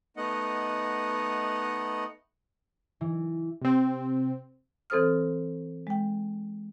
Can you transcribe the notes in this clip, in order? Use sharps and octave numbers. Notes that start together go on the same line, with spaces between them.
A3 B3 D#4 D#5 F#5
E3
C3 C4
E3 C4 A4 C5 D#6 F6
G#3 G5